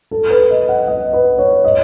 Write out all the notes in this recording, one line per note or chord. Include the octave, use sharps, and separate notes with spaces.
A4
B4
D#5
F#5
D#5
B4
C#5
D#5